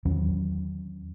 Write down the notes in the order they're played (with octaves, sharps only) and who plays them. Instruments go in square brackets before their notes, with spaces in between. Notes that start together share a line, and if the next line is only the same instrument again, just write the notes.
[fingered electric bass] E2 D#3 F#3 C#4